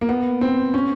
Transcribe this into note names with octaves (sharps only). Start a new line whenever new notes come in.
A#3
B3
C4
C#4